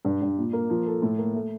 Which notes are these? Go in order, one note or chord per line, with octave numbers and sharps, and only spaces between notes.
G2
G2
A#2
A#3
F3
A4
A2
A#3
A3